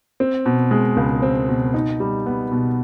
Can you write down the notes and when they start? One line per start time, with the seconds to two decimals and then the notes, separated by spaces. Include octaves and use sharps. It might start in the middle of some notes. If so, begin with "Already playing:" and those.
0.20 C4
0.46 B2
0.71 G#3
0.97 C#2
1.22 C4
1.49 B2
1.74 D#4
2.00 G3
2.26 B3
2.51 B2